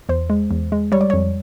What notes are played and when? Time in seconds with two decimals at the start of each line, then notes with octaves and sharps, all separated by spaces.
0.09 E2 C5
0.30 G#3
0.51 E2
0.72 G#3
0.92 G3 C#5
1.01 D5
1.10 F2 C#5